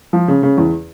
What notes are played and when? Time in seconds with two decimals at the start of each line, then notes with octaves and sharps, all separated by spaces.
0.13 F3
0.28 C#3
0.43 C#3
0.58 E2